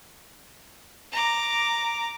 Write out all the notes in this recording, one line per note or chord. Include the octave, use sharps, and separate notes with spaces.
A#5 D6